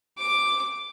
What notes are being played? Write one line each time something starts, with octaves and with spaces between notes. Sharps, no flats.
D6